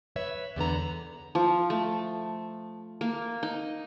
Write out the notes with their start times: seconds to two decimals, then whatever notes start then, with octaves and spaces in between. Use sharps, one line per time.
0.16 B4 C#5 E5
0.56 E2 D3 B3 A#5
1.35 F3
1.70 A3
3.01 A#3
3.43 D#4